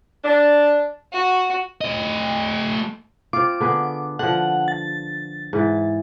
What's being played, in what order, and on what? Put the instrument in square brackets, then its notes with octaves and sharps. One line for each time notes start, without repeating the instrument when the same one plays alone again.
[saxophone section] D4
[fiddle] F#4
[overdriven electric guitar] A3 D#5
[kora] C4 F4 [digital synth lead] D6
[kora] D3 B3 G#4
[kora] D3 F3 [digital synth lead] F#5
[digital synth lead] A6
[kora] G#2 E3